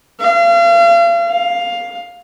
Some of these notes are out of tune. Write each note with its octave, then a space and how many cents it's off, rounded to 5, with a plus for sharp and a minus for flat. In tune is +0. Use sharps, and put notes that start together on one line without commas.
F5 -40
F5 +5